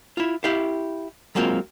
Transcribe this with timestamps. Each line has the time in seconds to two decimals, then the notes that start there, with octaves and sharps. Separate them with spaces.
0.17 E4 F4
0.44 E4 G4 F5
1.35 F#3 G#3 A#3 C4 F4